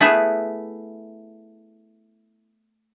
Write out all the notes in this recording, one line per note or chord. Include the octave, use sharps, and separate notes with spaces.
A3 B3 E4 G#4 B4 E5